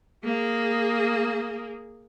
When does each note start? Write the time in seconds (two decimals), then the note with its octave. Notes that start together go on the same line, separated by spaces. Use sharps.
0.24 A#3 G#4